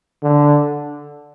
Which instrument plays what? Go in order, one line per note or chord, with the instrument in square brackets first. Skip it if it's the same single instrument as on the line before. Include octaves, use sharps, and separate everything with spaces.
[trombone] D3